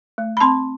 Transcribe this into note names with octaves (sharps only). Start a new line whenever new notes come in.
A3
B5
C4 A5 C6